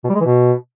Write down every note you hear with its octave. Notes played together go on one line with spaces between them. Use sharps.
B2
G3
G#3
E3
B2